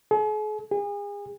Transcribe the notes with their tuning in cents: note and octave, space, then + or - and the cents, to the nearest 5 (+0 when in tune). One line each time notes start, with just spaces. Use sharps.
G#4 +45
G#4 -35